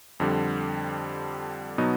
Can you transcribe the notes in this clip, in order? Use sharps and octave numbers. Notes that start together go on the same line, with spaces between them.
F2 D3 G3
B2 F#3 B3 D#4